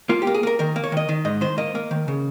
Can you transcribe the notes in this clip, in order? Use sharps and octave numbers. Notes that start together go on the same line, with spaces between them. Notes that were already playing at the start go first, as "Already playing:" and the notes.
A#3 F4
G4
A#3
G#4
A#3 A#4
D#3 A#4
A#3
C#5
D#3 D#5
D#3
G#2 D#5
D#3 C5
A#3 D#5
A#3
D#3
C#3